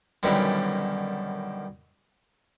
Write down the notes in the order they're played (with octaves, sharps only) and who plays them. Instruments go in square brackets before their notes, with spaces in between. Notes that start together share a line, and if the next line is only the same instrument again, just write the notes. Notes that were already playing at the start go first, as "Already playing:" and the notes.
[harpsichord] F#2 B2 D3 D#3 G3 C#4